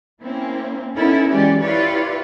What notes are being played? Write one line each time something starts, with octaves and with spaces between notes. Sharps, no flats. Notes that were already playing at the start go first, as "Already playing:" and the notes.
A#3 C4 C#4 E4
B3 C#4 D#4 E4 A4 A#4
E3 F#3 G#3 C#4 G4 D5
E4 F4 G4 B4 C#5 D5